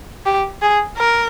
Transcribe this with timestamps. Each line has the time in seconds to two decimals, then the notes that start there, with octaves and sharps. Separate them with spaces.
0.26 G4
0.62 G#4
0.98 A#4